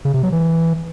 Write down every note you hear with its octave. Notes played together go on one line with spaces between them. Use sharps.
C#3
C3
F#3
E3